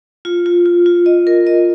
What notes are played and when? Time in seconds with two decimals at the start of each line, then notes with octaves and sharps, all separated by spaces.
0.25 F4
0.46 F4
0.66 F4
0.86 F4
1.06 D#5
1.27 A#4
1.47 D#5